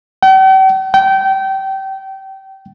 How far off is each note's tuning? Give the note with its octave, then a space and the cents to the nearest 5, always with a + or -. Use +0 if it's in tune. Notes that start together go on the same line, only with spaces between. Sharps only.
G5 -45
G5 -25